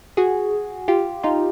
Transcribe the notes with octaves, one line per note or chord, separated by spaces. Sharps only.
F#4 G#4
F4 G4
D#4 F4